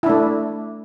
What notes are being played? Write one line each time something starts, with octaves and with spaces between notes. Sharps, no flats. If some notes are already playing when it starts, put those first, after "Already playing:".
A3 D4 E4